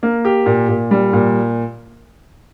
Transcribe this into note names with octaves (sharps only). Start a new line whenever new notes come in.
A#3
G4
A#2
A#2
G3
A#2